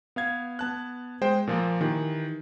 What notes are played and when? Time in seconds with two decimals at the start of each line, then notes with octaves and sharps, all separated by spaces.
0.16 B3 F5 G#6
0.59 B3 A5 F#6
1.21 G#3 C5 G5
1.47 A#2 F3 A#3
1.81 D#3 E3 G4